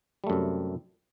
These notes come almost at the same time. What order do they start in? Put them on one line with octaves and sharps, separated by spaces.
G3 A3 F#2 C3